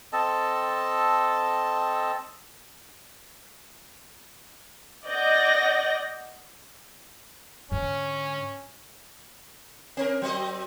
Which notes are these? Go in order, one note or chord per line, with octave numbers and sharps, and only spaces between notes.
C4 A4 D#5 A5
D5 D#5 F#5 G6 A#6
G#2 D3 C#4
C4 A#4
F#3 C4 D#5